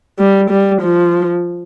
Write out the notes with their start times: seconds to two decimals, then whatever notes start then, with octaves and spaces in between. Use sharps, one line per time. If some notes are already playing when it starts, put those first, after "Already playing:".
0.19 G3
0.50 G3
0.82 F3